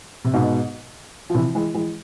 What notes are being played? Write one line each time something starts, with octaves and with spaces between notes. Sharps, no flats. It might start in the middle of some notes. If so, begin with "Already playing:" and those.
C3
G#2 B2
F3
C3 E3
E3 G#3
E3 G#3